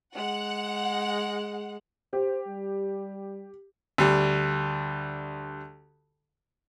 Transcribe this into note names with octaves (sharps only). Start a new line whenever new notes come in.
G#3 F#5
G4 C5
G3
D2 G3